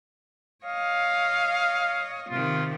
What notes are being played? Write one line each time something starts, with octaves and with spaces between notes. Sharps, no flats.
C#5 D#5 F5
C3 D#3 F4